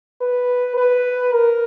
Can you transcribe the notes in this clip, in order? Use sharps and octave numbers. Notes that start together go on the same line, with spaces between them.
B4
B4
A#4